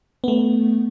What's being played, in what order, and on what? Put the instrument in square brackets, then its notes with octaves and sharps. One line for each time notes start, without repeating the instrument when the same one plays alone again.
[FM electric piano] A3 B3